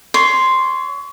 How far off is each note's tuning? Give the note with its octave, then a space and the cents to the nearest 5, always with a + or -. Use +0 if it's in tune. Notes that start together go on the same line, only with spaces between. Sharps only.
C#5 +25 C6 +0